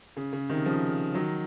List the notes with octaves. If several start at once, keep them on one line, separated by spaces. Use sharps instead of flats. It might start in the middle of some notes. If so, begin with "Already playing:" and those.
C#3
C#3
C3 D#3
C#3 F3
D#3 F#3